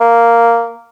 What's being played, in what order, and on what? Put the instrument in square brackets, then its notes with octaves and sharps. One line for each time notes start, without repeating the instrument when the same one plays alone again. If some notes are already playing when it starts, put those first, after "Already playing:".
[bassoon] A#3